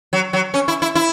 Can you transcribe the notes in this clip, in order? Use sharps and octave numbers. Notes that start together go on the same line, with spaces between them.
F#3
F#3
C#4
E4
E4
E4